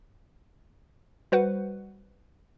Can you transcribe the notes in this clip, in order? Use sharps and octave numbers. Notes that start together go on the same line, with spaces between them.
G3 F#4 B4 C5 F#5